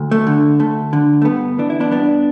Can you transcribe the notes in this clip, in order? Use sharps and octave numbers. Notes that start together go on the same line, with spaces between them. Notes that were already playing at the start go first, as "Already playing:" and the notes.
Already playing: D2
A3
D3
D2 A3
D3
A3
G2 B3
E3 D4
E4
B3 D4
G2 B3 D4